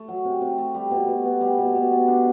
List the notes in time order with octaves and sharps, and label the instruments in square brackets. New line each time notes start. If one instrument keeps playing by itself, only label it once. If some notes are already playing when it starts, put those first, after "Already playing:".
Already playing: [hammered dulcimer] A3
F#3
C3
C3
A3
G3
B2
B2
B3
G3
B2
B2
B3
D4